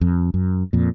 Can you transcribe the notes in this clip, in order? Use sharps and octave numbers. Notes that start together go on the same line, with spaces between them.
F2
F#2
F2 A#2